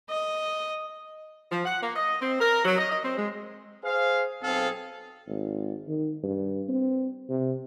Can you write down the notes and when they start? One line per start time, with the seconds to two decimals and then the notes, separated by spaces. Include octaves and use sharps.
0.10 D#5
1.50 F3
1.65 F#5
1.81 A#3
1.95 D#5
2.21 C4
2.40 A#4
2.64 F#3
2.78 D#5
2.89 D#5
3.03 C4
3.16 G#3
3.84 G#4 C5 F5
4.43 B1 C4 G#4 A4 F5
5.28 G#1
5.88 D#3
6.23 G2
6.68 C4
7.29 C3